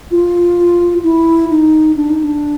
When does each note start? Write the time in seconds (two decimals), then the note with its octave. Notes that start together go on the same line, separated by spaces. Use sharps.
0.11 F4
1.04 E4
1.50 D#4
1.96 D4
2.10 D#4
2.24 D4